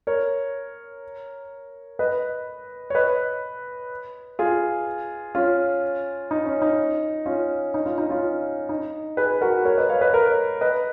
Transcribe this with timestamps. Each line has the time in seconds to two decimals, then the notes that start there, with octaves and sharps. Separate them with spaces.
0.07 A#4 C#5
1.99 B4 D#5
2.90 C#5
2.95 B4 D#5
4.39 F4 G#4
5.35 C#4 F4
6.31 D#4
6.46 C#4
6.62 D#4
7.26 C#4 F4
7.74 D#4
7.85 C#4 F4
7.98 D#4
8.10 C#4 F4
8.69 D#4
9.17 G#4 B4
9.41 F#4 A#4
9.65 A#4 C#5
9.78 B4 D#5
9.89 C#5 F5
10.01 B4 D#5
10.13 A#4 C#5
10.61 B4 D#5